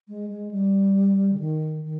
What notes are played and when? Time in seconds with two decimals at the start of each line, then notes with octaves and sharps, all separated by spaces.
0.08 G#3
0.30 G#3
0.51 G3
1.33 D3
1.40 D#3
1.84 D#3